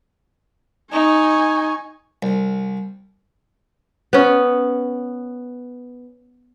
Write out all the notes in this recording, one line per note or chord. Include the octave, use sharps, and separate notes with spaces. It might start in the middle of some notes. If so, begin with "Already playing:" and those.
D#4 G#5 C#6
C2
B3 C#4